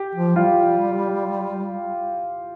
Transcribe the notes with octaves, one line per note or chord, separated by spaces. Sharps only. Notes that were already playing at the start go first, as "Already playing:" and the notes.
Already playing: G4
F3
G3 F4